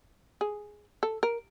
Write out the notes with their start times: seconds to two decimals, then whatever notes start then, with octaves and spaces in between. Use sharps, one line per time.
0.41 G#4
1.03 A4
1.23 A#4